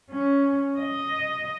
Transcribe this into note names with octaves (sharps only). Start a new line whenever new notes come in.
C#4
D#5